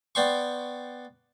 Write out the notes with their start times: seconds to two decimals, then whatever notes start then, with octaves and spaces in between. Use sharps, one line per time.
0.15 B3 D5 G5 C6 C#6